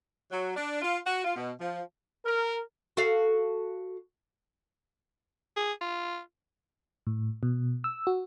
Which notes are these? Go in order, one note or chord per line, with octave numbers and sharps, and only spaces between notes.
F#3
D4
F4
F#4
F4
B2
F3
A#4
F#4 A4 F5
G#4
F4
A2
B2
E6
F#4